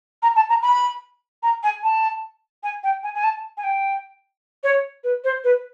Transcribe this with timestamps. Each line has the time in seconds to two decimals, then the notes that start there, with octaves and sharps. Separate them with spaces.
0.23 A#5
0.36 A5
0.49 A#5
0.62 B5
1.43 A#5
1.63 G#5
1.83 A5
2.63 G#5
2.83 G5
3.03 G#5
3.15 G#5
3.24 A5
3.57 G#5
3.64 G5
4.63 C#5
5.04 B4
5.24 C5
5.44 B4